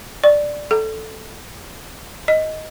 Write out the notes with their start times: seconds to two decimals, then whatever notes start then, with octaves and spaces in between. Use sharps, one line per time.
0.24 D5
0.71 A4
2.28 D#5